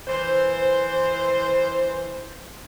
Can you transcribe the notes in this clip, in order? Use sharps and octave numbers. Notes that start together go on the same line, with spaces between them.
E3 C5